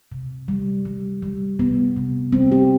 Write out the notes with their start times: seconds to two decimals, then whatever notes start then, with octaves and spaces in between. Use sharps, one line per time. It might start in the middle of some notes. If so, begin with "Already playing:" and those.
0.12 C3
0.48 G3
0.85 G3
1.22 G3
1.59 C3 B3
1.96 C3
2.32 G3 C4
2.52 G4